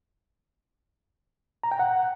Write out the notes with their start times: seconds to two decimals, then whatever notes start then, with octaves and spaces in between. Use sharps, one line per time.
1.63 A#5
1.71 G5
1.79 F#5